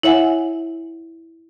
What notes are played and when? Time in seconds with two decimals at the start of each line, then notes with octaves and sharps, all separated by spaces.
0.03 E4 C#5 E5 F#5 G#5